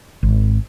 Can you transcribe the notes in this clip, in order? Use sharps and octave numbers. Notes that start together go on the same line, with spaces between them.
G#1